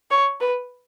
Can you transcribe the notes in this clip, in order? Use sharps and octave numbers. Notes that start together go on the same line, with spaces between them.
C#5
B4